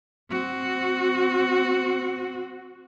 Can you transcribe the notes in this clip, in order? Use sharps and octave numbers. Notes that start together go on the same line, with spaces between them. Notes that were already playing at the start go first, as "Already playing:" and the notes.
C4 F#4